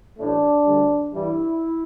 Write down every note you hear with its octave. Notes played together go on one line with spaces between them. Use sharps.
A1 A2 A3 D4
D2 D3 G3
G2 E3 G3 E4